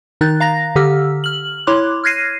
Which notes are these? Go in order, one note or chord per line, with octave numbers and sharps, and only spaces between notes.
D#3 D#4 F#6 A6
F5 A#5 A#6
D3 G4 E6 F6
F6 F#7
E4 C#5 C6 D6 F#6
F6 F#6 G#6 A#6 C7 D#7